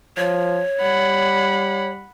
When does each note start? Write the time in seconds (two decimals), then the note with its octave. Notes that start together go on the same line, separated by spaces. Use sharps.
0.17 F3 C#5
0.83 G3 F#5 B5